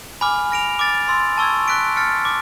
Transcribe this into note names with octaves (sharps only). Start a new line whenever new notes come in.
G#5 B5 D6 F6
F6 A#6 D7 F7
D6 F6 A6 D7
C6 E6 A6
A5 C#6 E6 G#6
C#6 F#6 B6 D7
F6 A6 C#7
D6